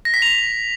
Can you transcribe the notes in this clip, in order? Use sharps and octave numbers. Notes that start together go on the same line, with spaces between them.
A#6
B6
F7